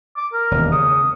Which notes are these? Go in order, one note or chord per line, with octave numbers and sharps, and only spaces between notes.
D6
A#4
E1 D#2
C#3 D#6